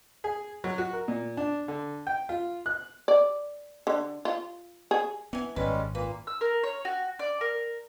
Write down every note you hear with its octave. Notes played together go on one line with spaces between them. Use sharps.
G#4
F#3
F#4
A#4
A#2
D4
D3
G5
F4
F#6
D5
D3
F4
G#4
E3 B3 G#5
G#1 F#2 G3 G#3 C#4 B4
A#2 A#3 B4
E6
A#4
C#5
F#4
D5
A#4